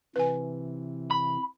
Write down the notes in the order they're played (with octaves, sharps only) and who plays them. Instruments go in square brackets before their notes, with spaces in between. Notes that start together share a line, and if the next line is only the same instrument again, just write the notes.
[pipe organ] C3 E3 [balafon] B4 G#5
[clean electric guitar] B5